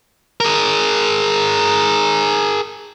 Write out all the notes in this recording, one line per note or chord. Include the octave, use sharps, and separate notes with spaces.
G#4 A#4